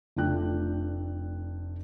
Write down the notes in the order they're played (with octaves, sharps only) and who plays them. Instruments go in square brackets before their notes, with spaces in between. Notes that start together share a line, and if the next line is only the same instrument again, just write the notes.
[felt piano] F1 A3 D4 F4 G5 F#6